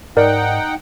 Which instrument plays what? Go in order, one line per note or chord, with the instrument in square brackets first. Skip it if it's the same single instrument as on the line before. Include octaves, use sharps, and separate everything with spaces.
[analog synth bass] G#2 [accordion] D#4 F#5 G5 [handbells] A#4 D5